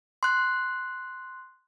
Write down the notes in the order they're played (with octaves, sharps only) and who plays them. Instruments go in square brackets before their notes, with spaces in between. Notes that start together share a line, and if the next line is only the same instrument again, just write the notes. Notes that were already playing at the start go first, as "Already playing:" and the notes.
[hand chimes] C6 F#6